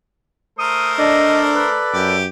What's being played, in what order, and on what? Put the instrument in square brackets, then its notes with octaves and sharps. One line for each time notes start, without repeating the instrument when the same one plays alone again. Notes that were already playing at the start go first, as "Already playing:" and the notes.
[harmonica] A3 A#4 C5 [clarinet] D#6
[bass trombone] D4 [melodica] A4 D5 [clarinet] D#5
[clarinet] B4
[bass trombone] F#2 [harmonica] G4 D6